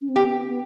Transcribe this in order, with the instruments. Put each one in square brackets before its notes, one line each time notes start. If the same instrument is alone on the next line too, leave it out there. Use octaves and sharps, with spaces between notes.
[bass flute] C#4
C4
[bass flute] B3 [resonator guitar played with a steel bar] G4
[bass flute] B3